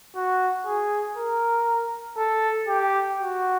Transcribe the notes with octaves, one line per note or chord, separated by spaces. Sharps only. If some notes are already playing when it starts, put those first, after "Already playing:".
F#4
G#4
A#4
A4
G4
F#4